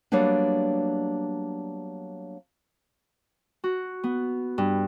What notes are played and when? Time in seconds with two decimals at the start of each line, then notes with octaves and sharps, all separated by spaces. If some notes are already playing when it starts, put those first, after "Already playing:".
0.12 F#3 G3 A#3 B3 D4
3.64 F#4
4.04 B3
4.58 G2